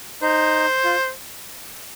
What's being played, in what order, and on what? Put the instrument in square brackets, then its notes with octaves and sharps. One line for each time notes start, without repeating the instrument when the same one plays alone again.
[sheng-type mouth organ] D#4 [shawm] C5
[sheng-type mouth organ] F4